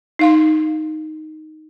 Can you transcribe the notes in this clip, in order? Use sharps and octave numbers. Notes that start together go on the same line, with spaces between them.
D#4 F5 C6